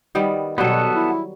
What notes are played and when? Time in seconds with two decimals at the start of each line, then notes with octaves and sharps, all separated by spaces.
0.15 D#3 G3 B3
0.58 B2 F#3 G3 B3 F#4 A4
0.95 E4